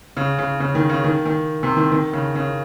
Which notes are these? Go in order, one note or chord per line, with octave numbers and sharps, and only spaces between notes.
C#3
C#3
C#3
D#3
C#3
D#3
D#3
C3
D#3
D#3
C#3
C#3